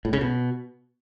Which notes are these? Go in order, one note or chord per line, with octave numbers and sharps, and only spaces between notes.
A2
C#3
B2